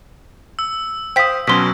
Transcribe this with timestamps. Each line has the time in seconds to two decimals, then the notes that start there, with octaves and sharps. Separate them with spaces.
0.59 E6
1.16 C5 F5 G5 D#6 B6
1.47 B2 F#3 C#4 C6 B6